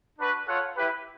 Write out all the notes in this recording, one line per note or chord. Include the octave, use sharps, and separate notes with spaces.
D4 F#4 B4
F4 A4 C#5 F#5
E4 G4 B4